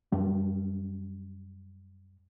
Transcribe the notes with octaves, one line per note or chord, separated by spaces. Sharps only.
F#2 G3